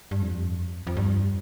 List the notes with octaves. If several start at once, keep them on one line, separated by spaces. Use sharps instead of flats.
G2
F2
F2
G2